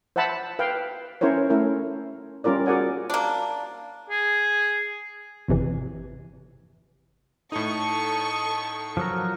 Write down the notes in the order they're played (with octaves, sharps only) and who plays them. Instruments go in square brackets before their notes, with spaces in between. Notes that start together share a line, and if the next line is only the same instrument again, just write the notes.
[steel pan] C5 E5 F#5 A5 B5
B4 F5 G5
C#4 E4 A#4 C5 C#5
A3 C#4 E4 A#4
G3 C#4 F4 A#4 D5
F#4 G#4 A#4 D5 F#5 G#5
[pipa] A#3 D4
[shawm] G#4
[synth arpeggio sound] G#1 F2 C3 E3
[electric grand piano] A2 D#4 [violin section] A4 C#6 [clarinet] D#6
[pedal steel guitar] F3 F#3 A#4